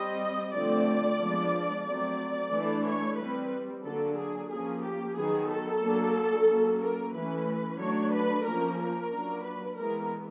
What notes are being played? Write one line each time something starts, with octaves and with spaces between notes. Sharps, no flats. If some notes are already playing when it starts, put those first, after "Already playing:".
Already playing: G3 C4 D#5
D3 F3 A3 C4 D5
F3 G#3 B3 D4
F#3 A3 C4 D5
E3 A3 D4
C#5
G3 C4 B4
D3 F#3 A#3 D4 A4
G#4
F3 A#3 C#4 G#4
G4
D#3 F#3 B3 G#4
A4
F#3 A#3 D4
F#3 A#3 C#4
A#4
E3 A3 C#4 B4
F#3 A3 D4 C#5
B4
F3 A#3 C#4 A#4
A#4
F#3 A#3 D4
B4
E3 G#3 B3 A#4